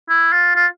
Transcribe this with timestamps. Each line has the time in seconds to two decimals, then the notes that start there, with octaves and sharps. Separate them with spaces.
0.09 E4
0.33 F4
0.56 F4